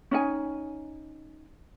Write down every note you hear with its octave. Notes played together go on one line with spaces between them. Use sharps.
C#4 D#4 G#5